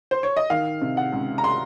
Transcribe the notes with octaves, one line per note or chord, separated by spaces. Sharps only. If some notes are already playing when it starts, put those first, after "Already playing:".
C5
C#5
D#5
D#3 F5
C3
F#5
C#2
A#5
C6